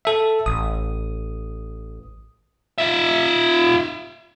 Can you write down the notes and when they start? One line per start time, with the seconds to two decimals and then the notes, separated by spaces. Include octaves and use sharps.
0.05 A4 E5
0.46 A1 D#6
2.78 F4 E5